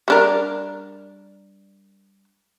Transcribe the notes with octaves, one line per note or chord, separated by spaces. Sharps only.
G3 D4 A#4